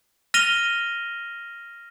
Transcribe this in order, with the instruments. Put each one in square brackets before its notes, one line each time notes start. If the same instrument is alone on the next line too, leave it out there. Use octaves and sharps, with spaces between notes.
[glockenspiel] F6 A#6 D#7 F7 G7